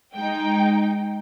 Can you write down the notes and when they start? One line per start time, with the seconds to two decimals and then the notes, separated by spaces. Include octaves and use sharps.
0.15 G#3 D#4 G5